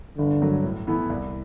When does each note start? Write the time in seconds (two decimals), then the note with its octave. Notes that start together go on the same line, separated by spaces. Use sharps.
0.18 G1 D3
0.41 G2 F#3 A3
0.64 A2
0.87 E3 B3 E4 A4
1.10 C2